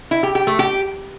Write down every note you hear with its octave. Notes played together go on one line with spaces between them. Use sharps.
E4
G4
G4
A3
G4